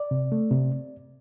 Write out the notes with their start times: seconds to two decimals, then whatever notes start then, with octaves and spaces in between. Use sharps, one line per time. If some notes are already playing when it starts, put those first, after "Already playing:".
Already playing: D5
0.11 C3
0.32 A3
0.51 C3